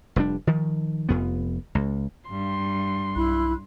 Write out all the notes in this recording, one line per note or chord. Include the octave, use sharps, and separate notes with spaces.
F1 G3 D4
D#3 F3
F1 F2 B3
C#2
G2 C6
B1 E4 B5 F#6